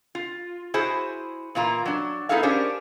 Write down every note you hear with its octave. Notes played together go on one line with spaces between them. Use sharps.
F4
E4 F#4 G#4 C5
A#2 E3 A#3 F4 A#5
F#3 D4
B3 D#4 E4 G#4 A4 F5
C#4 D4 G4 G#4 A#4 C5